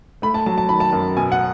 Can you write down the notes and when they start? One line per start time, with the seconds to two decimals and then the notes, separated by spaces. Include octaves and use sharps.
0.22 A3 B5
0.34 A5
0.46 F#3 A5
0.58 A5
0.69 D#3 B5
0.80 A5
0.93 F#2
1.17 B2 G#5
1.32 F#5